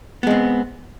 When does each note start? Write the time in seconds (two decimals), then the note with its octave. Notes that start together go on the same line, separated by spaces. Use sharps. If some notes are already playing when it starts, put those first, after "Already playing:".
0.23 B3
0.27 G#3
0.30 C4